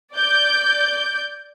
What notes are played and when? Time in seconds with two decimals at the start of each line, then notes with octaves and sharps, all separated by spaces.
0.14 D5 G6